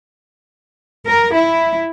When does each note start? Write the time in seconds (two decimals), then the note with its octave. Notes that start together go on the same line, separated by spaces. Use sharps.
1.04 A#4
1.33 E4